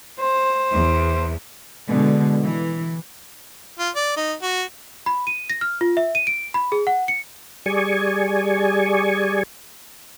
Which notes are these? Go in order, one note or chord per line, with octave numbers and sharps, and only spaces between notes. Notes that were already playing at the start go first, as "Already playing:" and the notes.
C5
E2
B2 D3 G#3
E3
F4
D5
D#4
F#4
B5
D#7
A#6
F6
F4
E5
D#7
D7
B5
G#4
F#5
C#7
G3 G#4 D5 G#5 C#6